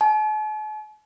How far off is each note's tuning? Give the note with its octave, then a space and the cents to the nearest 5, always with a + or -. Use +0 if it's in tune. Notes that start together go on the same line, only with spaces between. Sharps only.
A5 -45